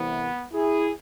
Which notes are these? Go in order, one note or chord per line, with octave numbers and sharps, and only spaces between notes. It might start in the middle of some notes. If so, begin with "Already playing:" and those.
Already playing: C2 C3 E3 B3
E4 G#4